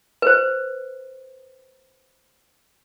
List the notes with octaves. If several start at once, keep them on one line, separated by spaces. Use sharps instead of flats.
B4 C5